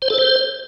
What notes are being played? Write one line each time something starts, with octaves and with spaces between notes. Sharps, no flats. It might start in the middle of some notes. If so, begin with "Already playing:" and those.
C5
A4
C5